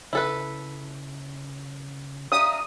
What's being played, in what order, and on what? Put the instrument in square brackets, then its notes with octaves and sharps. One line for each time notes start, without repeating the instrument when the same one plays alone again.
[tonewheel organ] C#3 [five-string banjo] E4 A4 B4
[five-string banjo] D4 G4 [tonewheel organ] E5 F5 A#5 [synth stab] D#6